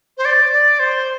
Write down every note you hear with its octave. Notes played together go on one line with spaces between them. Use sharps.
C5
D5
D5
C5